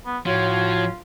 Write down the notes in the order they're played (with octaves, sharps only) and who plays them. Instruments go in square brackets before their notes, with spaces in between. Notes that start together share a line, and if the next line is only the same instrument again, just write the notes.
[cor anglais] B3
[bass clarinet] A2 [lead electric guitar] F3 [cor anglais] F4 [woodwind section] F#4 C#5